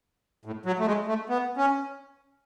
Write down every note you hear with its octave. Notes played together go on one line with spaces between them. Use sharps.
A2
F#3
A3
G#3
A3
B3
C#4